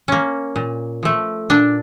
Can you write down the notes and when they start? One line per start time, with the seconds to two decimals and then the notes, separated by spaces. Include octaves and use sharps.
0.08 A#3 C#4
0.56 A#2
1.03 F3 A3
1.50 A#2 D4